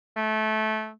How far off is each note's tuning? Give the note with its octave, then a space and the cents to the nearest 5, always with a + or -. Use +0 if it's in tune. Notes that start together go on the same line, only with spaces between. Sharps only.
A3 -20